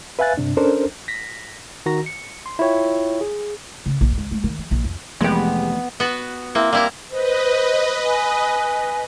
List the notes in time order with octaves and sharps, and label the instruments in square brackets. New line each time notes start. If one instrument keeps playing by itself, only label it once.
[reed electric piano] B4 E5 F5 G#5 F#6 A6
G2 C3 D4
C#4 D4 A4 A#4 C5
[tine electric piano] A#6 B6
D#3 F#4 A#5 A#6
C#7
C6
E4 F4 C#5 G5
G#4
[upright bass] C#3
A#1
C#2
G#3
D#3
F3
A#1
F2
[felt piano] F1 [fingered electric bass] E3 A3 [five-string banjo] G#3 G4 [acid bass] B3
[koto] B3 F#4
[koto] A#3 C4 [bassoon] E4
[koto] G3 E4 A#5 [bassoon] A#3
[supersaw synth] B4 D#5 [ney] C5
[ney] G#5